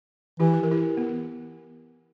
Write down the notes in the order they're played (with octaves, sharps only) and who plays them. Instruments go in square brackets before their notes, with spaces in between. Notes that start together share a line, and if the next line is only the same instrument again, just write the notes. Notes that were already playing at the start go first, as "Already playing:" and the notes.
[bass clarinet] E3 [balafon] E4 G4
[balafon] B4
A#4
E4 G4
B3